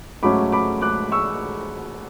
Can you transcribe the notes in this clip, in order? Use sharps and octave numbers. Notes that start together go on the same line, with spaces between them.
G#2 F#3 A3 C#4 B5 D6
B5 D6
D6 F#6
C#6 E6